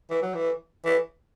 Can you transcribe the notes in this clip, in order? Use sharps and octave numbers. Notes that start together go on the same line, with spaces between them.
E3
F#3
E3
E3